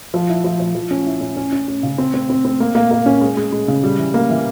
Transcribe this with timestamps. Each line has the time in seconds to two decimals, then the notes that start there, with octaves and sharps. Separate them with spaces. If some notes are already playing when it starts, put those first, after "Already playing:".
0.14 F3
0.29 E4
0.44 F3
0.60 F3
0.75 F3
0.91 C#4
1.06 E4
1.21 C#4
1.37 C#4
1.53 C#4
1.68 C#4
1.83 C#3
1.98 C4
2.14 C4
2.30 C4
2.45 C4
2.60 A#3
2.75 A#3
2.91 A#3
3.06 C#4
3.21 G#3
3.37 G#3
3.52 G#3
3.68 C#3
3.83 G3
3.98 E3
4.14 A#3
4.30 E3